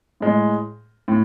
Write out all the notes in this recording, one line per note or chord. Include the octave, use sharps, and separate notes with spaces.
A2 G#3
A2